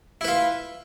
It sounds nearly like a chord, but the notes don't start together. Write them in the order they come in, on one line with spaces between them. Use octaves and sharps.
E4 B4 F4